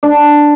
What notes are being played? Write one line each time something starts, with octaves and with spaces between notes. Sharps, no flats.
D4